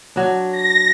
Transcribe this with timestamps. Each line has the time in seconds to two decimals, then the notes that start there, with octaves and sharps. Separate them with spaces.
0.16 F#3 D4
0.52 A#6